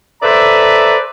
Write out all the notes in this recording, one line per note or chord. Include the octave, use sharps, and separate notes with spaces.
A4 B4 C5 D5 E5 A#5